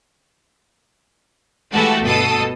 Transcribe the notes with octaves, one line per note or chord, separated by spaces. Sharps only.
E3 G#3 A3 F#4 G4 A4
G1 B2 A4 A5 D#6